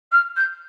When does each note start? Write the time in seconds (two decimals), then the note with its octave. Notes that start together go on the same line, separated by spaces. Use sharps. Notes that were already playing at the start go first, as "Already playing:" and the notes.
0.12 F6
0.36 G6